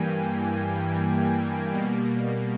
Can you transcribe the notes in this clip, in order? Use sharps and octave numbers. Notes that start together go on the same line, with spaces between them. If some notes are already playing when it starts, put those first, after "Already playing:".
Already playing: G2 E3 G3 A#3 G5 G#5
G#5
B2 G3 A#3